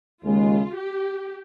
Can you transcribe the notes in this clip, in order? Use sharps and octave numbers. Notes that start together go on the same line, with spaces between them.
D#2 C#3 G#3 F4
G4